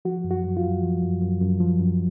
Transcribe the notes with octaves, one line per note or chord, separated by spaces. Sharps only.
F3 F#4
F#2
F#4
F#2
F4
F#2
F3
F#2
F#2
F#2
F3
F#2